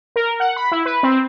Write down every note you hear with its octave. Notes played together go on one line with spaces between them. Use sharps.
A#4
F#5
B5
E4
B4
C4